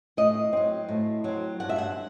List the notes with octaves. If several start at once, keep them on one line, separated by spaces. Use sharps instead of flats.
A2 D#5
F#3 C4
A2
F#3 C4
G2 F#5
E5
F#5